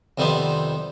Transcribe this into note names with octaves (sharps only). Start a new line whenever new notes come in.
F2 C3 D#3 G3 B3 C4